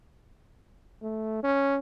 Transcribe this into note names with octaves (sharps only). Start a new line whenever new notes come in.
A3
C#4